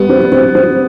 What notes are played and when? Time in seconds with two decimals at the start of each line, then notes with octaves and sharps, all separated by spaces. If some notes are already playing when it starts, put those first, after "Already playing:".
Already playing: G3 B3
0.09 C4
0.32 C4
0.55 C4